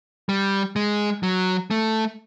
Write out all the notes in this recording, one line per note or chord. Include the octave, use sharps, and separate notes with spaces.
G3
G#3
F#3
A3